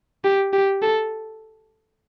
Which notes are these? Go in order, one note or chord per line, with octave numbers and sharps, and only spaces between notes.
G4
G4
A4